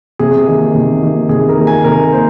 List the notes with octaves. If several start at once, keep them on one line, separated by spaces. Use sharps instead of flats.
C3 G#4
D#3 A#3
C3
D#3 A#3
C3 G#4
A#4
D#3 A#3
G#5
C3 A#4
A#3 C5